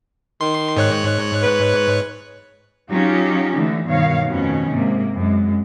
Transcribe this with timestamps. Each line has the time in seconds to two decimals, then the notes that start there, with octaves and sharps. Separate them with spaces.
0.41 D#3 C6
0.77 G#2 C#5 F#6
1.42 B4
2.91 F#3 C#4 D#4 F4 G4
3.55 D3 E3 A3 D#4
3.86 G2 B2 D#3 C#5 F5
4.28 F2 B2 D#3 A3 C#4
4.71 G#2 C3 A#3
5.13 F#2 G#3